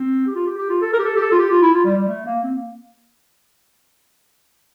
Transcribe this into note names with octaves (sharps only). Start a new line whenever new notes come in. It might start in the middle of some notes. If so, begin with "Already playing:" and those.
Already playing: C4
G4
F4
G4
G4
F4
A4
A#4
G4
A4
G4
A4
F4
G4
F4
E4
F4
G3
G3
A3
A#3
C4
A#3